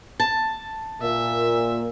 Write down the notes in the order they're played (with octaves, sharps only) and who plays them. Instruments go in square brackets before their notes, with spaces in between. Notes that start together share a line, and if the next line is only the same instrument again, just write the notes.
[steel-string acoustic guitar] A5
[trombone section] A#2 [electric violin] E5